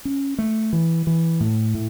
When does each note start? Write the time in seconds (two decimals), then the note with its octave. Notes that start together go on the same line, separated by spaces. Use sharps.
0.05 C#4
0.38 A3
0.73 E3
1.07 E3
1.40 A2
1.74 A2